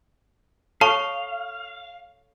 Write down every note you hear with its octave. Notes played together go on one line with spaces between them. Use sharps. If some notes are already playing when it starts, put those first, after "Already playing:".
A4 C#5 F5 A5 C#6